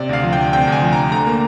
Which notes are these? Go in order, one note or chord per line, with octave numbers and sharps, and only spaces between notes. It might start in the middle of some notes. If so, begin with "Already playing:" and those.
Already playing: C3 D5
D2 F5
F3
G5
D2
C3 G5
D2 G#5
F3
D2 A#5
D3 A#5
A#3